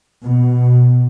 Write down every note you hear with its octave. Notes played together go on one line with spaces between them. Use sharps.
B2